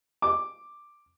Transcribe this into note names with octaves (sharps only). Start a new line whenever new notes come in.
D6